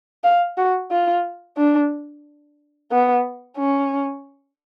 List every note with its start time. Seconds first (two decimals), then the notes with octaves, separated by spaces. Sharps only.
0.24 F5
0.57 F#4
0.91 F4
1.57 D4
2.92 B3
3.58 C#4